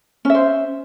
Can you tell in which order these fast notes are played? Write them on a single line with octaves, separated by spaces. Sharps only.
C#4 E5 C5